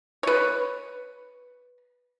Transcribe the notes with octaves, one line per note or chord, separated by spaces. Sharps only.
B4 C#5